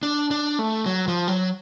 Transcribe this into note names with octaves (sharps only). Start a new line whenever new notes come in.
D4
D4
A3
F#3
F3
F#3